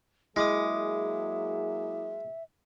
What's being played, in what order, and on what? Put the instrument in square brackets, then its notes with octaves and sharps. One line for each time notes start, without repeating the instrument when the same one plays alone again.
[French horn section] F#3 A#3 G#4 [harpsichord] G#3 [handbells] E4 D6 D#6 [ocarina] E5